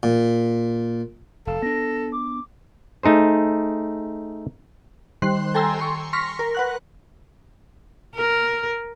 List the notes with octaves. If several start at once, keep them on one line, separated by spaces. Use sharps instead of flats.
A#2
F1 A4 F5
B3 D4 A#6
D6
A3 D#4 G#4 C5
D#3 G3 C5 C6 F#6
A4 G5 G#5 A#5 C6 E6
C6 C#6
C6 C#6 F6 A#6 B6
A#4
B4 F#5 F#6
A#4